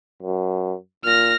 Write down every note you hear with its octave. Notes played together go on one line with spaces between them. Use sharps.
F#2
A#2 F6 A#6